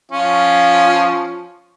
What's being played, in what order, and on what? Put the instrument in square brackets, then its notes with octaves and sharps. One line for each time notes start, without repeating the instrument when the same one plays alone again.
[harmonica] F3 C#4 F4